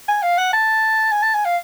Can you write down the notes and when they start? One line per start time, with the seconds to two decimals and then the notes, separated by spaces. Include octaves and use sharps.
0.08 G#5
0.22 F5
0.38 F#5
0.53 A5
1.12 G#5
1.22 A5
1.34 G#5
1.45 F5